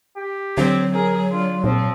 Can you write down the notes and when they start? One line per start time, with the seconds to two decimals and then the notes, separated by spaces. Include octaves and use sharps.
0.16 G4
0.57 D3 F#3 C4
0.95 G#4 A#4
1.32 D4 F4
1.64 A#2 F3 C4